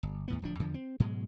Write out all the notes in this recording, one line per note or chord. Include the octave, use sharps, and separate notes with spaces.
G1
D#2 A2 B3
D1 F3 D4
E2 D3 F3
C4
G#2 B2 F#3 G#3